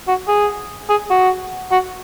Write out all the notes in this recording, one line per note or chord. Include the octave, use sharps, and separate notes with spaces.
F#4
G#4
G#4
F#4
F#4